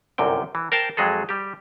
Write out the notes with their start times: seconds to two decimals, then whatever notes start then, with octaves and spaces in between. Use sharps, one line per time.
0.18 G1 C2 F#2 C3 G5
0.55 E3
0.72 A#4 C5 G5 A5
0.97 F2 F#3 G#3 G#4 A4
1.29 G3 G4